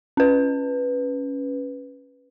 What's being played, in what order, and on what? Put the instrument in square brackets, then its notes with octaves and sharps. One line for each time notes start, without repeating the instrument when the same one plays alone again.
[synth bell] C#4 B4